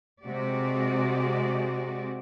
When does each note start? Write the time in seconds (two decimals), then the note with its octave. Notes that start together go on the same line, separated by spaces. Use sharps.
0.22 C3 G#3 F#4 G4 D5